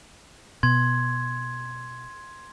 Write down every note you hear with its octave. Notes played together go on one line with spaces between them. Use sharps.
B2 C6 G#6